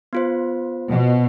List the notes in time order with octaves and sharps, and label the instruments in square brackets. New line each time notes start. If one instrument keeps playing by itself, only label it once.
[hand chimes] B3 F4 C5
[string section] B2